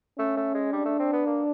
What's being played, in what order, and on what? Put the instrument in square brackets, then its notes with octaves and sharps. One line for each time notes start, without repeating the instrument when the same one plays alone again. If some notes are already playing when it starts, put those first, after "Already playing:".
[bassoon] A3 [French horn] C#4
[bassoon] A3
G#3
[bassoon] G3 [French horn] D4
[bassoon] A3
C4
B3
A#3